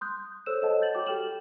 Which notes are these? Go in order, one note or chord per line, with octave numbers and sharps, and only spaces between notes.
C6 D#6 F#6 G6
A4 C5 C#5 E6 F#6 E7
A4 C5 C#5 D#5 F#5 A5
G6 A6 F#7
F#4 C#5 G5 D6
G4 A4 G5 F6 E7 F#7